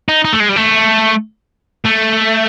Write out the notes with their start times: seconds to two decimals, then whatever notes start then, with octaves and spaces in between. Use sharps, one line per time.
0.09 D#4
0.25 D#4
0.33 A3
0.40 G#3
0.49 G3
0.56 A3
1.85 A3